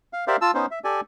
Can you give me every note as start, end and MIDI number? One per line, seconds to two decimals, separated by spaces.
0.13 0.25 77
0.27 0.36 67
0.27 0.36 70
0.27 0.36 72
0.27 0.36 74
0.27 0.36 76
0.27 0.36 77
0.41 0.51 65
0.41 0.51 81
0.41 0.51 88
0.54 0.66 59
0.54 0.66 61
0.54 0.66 63
0.54 0.66 72
0.71 0.79 76
0.84 1.01 67
0.84 1.01 69
0.84 1.01 74
0.84 1.01 80